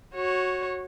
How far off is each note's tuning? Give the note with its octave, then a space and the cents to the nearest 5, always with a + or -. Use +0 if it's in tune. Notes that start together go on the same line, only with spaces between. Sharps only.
F#4 +0 C#5 -15